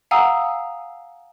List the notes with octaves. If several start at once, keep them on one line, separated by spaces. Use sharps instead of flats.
F5 F#5 G#5 A#5 D#6 E6